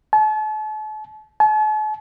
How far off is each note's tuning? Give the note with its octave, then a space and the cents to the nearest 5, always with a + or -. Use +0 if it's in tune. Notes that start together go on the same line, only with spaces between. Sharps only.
A5 -40
A5 -45